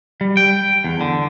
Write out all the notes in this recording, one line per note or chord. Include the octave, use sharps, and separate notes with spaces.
G3
G5
E2
D3